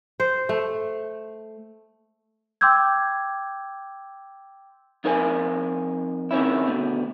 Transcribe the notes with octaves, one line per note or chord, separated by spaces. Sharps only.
C5
A3
G5 C6 D6 E6 G6 G#6
F2 D#4 A#4 C5 G#5
D#3 C4 C#4 E4
D2 B2 D3